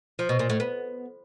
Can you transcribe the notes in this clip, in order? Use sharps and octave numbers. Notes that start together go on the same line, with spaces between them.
F3
B2
A#2
A2
B3